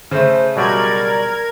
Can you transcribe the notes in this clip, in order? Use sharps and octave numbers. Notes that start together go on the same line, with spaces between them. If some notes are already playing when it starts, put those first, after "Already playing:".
C#3 A3 C5
B2 F#3 G3 A#4 D5 G#6